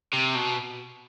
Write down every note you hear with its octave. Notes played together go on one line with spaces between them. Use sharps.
C3
B2